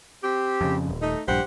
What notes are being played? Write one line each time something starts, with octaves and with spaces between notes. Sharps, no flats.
C4 G4
F2 C#3
D#1
A3 D#4
A#1 G2 G4 C5 F#5